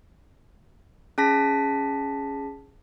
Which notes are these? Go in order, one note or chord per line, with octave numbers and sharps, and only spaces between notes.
C#4 G#4 A5 A#6 B6